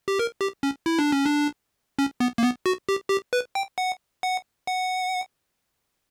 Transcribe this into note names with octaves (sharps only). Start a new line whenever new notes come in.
G4
A#4
G4
C#4
E4
D4
C#4
D4
C#4
B3
A#3
B3
F#4
G4
G4
B4
G5
F#5
F#5
F#5